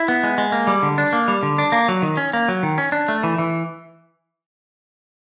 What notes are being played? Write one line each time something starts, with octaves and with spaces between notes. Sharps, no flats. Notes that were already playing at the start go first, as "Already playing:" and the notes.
Already playing: E4
B3
G#3
G#3
A#3
G3
D3
D4
A#3
G3
D3
D4
A#3
F#3
D#3
C#4
A#3
F#3
D#3
C#4
D4
A3
E3
E3